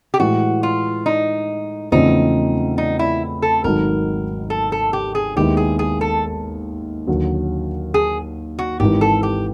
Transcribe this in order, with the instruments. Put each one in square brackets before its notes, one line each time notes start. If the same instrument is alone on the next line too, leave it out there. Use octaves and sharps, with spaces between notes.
[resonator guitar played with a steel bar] G4
[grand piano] A2 E3 G#3 [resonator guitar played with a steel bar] F#4
[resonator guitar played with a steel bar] F4
D#4
[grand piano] E2 C#3 F3 A3 C4 [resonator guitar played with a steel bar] D#4
[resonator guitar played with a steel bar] D#4
E4
A4
[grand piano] G#1 G#2 D#3 F#3 [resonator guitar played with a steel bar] A#4
[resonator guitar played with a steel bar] A4
A4
G4
G#4
[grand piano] D#2 D#3 G#3 B3 E4 [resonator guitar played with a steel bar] G4
[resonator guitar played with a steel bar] G#4
G#4
A4
[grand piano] D#2 D3 F#3
[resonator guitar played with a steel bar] G#4
F#4
[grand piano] G#1 G#2 E3 [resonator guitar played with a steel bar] G4
[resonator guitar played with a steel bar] A4
G4